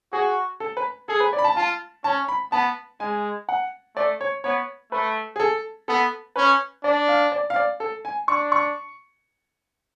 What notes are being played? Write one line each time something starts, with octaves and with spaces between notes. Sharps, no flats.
F#4 G#4
A4
B4
G#4 A4
B4
D5
B5
A5
F4 A5
C#4 A5
B5
B3 A5
G#3 G#5
F#5
A3 D5
C#5
B3 C#5
A3 B4
G#4
A4
B3 A4
C#4 B4
D4 D5
F5
D5
F5
D5
A4
G#5
D4 C#6
C#6